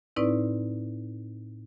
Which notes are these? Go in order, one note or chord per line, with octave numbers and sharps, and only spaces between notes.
A2 C4 D#4 E4 B4 D5